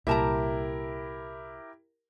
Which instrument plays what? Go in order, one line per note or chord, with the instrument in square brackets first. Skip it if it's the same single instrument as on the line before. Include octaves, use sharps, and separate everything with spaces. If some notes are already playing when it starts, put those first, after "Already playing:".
[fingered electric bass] C2 A#2 [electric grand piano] E4 G4 A#4 [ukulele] E5 A5 A#5